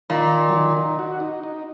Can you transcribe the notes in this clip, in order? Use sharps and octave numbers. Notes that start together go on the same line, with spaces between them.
A#2 D#3
F#3
D#3
D#4
F#4
D#4
D#4